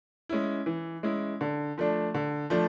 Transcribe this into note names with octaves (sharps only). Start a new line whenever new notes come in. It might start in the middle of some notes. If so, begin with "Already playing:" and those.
G#3 C#4 E4
E3
G#3 C#4 E4
D3
F3 A3 D4
D3
F3 A3 D4